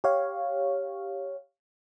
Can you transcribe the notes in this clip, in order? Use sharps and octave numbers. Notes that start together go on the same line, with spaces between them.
G4 C#5 F5